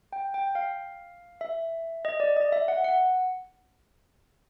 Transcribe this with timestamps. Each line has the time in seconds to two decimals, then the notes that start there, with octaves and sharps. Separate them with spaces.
0.13 G5
0.34 G5
0.55 F5
1.41 E5
2.05 D#5
2.20 D5
2.37 D#5
2.52 E5
2.68 F#5
2.84 F#5